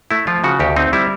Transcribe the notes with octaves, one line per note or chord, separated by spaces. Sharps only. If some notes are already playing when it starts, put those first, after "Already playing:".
A3 E4
F3 F4
C#3 F#4
D2 G4
C4 D#4
G3 E4